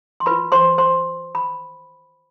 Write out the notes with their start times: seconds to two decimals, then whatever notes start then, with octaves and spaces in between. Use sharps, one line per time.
0.20 C6
0.26 F4 B4 B5
0.52 C5 C6
0.78 C5 C6
1.35 B5